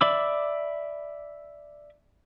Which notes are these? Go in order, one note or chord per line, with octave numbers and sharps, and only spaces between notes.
D5 E5 B5 D6 E6